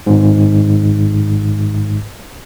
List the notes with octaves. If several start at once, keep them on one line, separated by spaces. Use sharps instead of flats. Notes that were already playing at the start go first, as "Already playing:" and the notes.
G#1 G#2